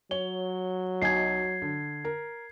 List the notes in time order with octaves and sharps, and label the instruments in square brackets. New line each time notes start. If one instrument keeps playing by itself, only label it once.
[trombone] F#3 [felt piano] C#5 [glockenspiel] G7
[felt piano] B1 D#5 G#5 [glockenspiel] G#6 C7
[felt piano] D3
A#4